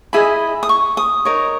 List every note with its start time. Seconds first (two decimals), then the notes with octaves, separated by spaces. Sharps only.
0.13 E4 G#4 D#5 B5
0.63 D#6
0.69 C#6
0.97 D#6
1.25 D#4 A#4 C#5